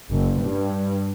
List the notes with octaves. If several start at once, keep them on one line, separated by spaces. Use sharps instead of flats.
F#1
G2